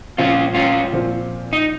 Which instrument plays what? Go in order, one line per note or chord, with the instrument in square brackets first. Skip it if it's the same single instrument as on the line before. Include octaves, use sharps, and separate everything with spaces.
[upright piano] A#2 F3 C4 [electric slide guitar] C#4 F4
[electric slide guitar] C#4 F4
[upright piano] A#2 F3 C4
[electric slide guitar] D#4